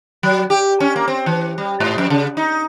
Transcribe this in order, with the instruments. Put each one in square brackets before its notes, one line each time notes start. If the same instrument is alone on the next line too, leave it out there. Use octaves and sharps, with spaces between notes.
[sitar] F#3
G4
C#4
A#3
C4
E3
G3
G#2
F2
C#3
D#4